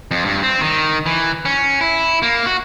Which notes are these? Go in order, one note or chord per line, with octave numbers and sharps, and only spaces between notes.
F2
G2
C4
D#3
E3
C#4
E4
A#3
F#4